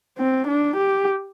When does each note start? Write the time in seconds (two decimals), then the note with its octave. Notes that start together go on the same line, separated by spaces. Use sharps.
0.18 C4
0.48 D4
0.76 G4